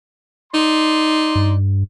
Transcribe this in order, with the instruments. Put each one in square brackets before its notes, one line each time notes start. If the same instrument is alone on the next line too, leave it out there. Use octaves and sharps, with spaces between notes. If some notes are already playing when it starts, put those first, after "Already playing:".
[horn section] D#4 D5 C6
[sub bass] G2